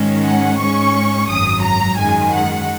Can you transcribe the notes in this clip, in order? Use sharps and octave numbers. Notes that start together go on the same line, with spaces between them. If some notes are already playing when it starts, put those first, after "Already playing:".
Already playing: G#2 D#3 G#3 C#4
F#5
G#2 G#3 C#4 C#6
G#1 F#2 F#3 D#6
A#5
F#2 D#3 G#3 G#5
F#5